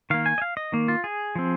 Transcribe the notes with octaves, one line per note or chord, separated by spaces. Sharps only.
D#3 A#3 F5
G#5
D#5
F5
D#5
D#3 A#3
F4
G#4
F3 C4